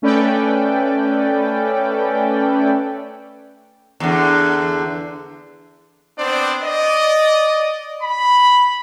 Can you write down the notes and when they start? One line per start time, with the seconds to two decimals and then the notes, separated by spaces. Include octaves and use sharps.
0.02 A3 C#4 A4 B4 D5 G5
4.00 E2 D3
6.19 B3 C4 D4 C5 D5
6.63 D5 D#5
8.02 B5